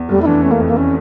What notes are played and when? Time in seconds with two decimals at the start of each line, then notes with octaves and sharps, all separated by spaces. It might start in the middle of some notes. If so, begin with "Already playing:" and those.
Already playing: E2
0.09 F1 G3
0.22 E4
0.26 E3 D4
0.43 A3 C#4
0.51 A#3
0.60 F2
0.68 A#3
0.77 C#4